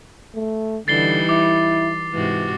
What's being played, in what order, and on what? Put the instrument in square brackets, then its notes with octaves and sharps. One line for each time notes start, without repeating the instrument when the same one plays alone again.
[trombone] A3
[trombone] D3 [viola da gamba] E3 G3 D#4 [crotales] A6 C7 G7
[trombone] E4 [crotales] D6
[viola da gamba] G#2 C3 F#4 [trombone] E3